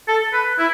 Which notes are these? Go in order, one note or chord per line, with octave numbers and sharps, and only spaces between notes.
A4
B4
E4